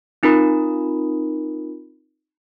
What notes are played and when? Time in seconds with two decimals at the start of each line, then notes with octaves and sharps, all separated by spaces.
0.23 C4 D#4 F4 A#4 B5